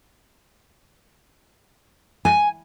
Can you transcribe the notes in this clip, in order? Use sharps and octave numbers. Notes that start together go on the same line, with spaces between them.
G#5